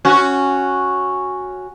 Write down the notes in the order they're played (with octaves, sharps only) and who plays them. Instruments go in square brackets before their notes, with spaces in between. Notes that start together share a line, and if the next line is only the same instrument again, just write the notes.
[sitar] C#4 F#4